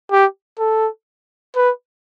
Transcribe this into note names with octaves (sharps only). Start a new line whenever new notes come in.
G4
A4
B4